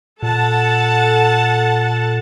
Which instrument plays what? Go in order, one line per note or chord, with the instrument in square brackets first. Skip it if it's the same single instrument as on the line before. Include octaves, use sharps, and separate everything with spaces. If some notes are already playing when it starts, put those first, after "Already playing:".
[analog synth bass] A#2 [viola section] A4 F#5 A5